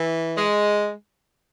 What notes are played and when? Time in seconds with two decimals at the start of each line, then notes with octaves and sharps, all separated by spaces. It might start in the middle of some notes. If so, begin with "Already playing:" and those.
Already playing: E3
0.36 G#3